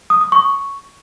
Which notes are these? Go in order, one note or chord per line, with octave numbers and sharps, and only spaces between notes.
D#6
D#6
C#6